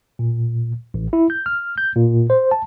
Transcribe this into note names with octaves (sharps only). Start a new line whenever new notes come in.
A#2
A1
E4
G6
F6
G6
A#2
C5
A5